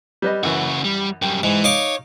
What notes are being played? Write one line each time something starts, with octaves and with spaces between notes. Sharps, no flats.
G3 B4 D#5
F#2 C#3 E3 F#4
G3
F#2 G3 G5
G#2 E3
D#4 C#5 F5 D6